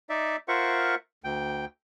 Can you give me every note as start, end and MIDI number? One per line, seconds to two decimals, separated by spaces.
0.09 0.36 63
0.09 0.36 74
0.09 0.36 76
0.48 0.95 65
0.48 0.95 70
0.48 0.95 72
0.48 0.95 76
0.48 0.95 78
0.48 0.95 85
1.24 1.65 38
1.24 1.65 79